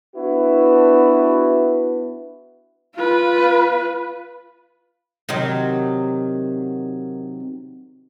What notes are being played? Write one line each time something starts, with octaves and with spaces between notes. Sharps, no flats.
B3 D4 E4 F#4 B4
F4 B4
C3 D#3 F#3